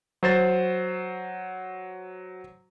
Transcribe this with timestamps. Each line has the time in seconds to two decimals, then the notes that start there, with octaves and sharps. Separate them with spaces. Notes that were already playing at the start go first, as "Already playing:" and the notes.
0.23 F#3 C5 A6